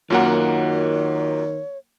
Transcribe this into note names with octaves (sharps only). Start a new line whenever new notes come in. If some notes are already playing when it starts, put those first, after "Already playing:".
F#2 D#3 A#3 F4 F#4 A#4 C#5 F#5